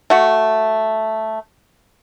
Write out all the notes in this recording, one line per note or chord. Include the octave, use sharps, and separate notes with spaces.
A3 F#4